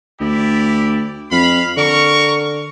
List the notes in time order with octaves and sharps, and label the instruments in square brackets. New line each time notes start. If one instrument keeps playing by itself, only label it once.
[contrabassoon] D2 [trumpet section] E4 G4 D5
[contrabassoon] F2 [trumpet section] F5 B5
[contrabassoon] D3 [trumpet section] A#4 C#6